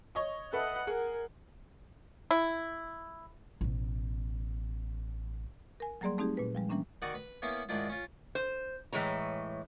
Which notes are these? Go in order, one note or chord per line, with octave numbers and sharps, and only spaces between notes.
C#5 D#5 C#6
A4 B4 D#5 E5 F#5
G#4 A#4 F#5
E4
A1 B2
A#4 G#5
F#3 G3 A#3 G#4 D5 C6
A3 C4 D#4 G4 G#4
A#2 B4
F3 G3 G#3
E3 G3 A#3 C#4 D4
D#3 D#4 F#4 D5 F#5 D#6
B4
A#3 B3 C#4 E4 E5 F5
G#2 D#3 D4 E4 F4
C#4 F4
C5
A2 E3 G#3 C#5 A#5